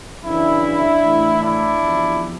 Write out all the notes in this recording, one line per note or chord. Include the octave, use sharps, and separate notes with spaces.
F#2 C#3 E3 D4 E4
A2 E3
D4 E4
E2 C3 F3